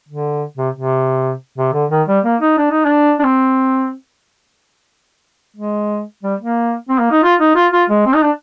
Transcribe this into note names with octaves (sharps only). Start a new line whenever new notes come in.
D3
C3
C3
C3
D3
D#3
G3
A#3
D#4
D4
D#4
D4
D4
C4
G#3
G3
A#3
C4
A#3
D#4
F4
D#4
F4
F4
G#3
C4
D#4
D4